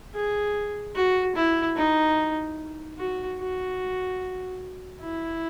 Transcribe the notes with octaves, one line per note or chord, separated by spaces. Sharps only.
G#4
F#4
E4
D#4
F#4
F#4
E4